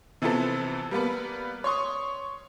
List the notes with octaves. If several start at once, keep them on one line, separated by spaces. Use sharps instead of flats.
C3 E3 F3 B3 C4 A4
G3 A#3 B3 B4
C#5 C6 C#6 D#6